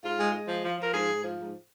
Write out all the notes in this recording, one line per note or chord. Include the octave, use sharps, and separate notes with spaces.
G#2 F4
G#3
G#3
F3
F3
F3 A#4
G#2 G#4
G#2
F3
G#2